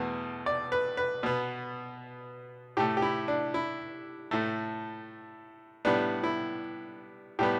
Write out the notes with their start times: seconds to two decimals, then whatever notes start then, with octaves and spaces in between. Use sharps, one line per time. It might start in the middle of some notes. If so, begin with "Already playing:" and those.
Already playing: E2 B2 A3
0.46 D5
0.72 B4
0.97 B4
1.23 B2 B3
2.77 A2 A3 G4
2.97 G4
3.02 E4
3.28 D4
3.54 E4
4.31 A2 A3
5.85 A2 G3 B3 D4
6.24 E4
7.39 A2 G3 B3 G4